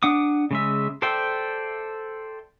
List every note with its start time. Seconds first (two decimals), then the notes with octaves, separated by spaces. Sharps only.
0.03 D4 F#5 D6 D#6
0.51 C#3 G#3 E5
1.02 A4 C5 D5 E5 G5